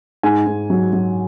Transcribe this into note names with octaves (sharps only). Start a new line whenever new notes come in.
G#2 G#5
G#2
F#3
F#3